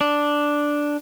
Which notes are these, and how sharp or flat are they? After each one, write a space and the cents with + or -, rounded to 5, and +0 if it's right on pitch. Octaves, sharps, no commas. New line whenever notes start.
D4 +0